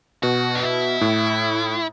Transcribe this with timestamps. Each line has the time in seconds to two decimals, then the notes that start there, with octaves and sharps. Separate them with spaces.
0.23 B2 F#4
0.55 D4
0.62 E4
1.01 A2